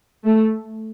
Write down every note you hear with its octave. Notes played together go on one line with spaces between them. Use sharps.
A3